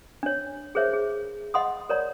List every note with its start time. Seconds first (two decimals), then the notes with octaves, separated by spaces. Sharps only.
0.23 D4 C#5
0.75 G#4 A#4 C5 C#5 E5
0.93 G#4
1.54 D#5 F#5 C6 D#6
1.89 A#4 C#5 D5 A#5